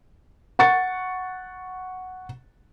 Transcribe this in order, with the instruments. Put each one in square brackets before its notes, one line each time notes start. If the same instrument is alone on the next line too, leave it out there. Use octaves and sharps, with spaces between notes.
[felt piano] F#5 C#6 A6 C#7